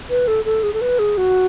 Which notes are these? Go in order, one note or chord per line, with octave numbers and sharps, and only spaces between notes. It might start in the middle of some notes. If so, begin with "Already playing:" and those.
B4
A4
A4
G#4
A4
B4
G#4
F#4